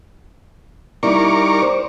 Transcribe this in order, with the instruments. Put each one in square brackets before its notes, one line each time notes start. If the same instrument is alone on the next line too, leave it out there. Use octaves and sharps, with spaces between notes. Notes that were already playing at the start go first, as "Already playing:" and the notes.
[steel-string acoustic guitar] G3 D#4 E4 [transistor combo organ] A#4 C#6 D6
[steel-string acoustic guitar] C5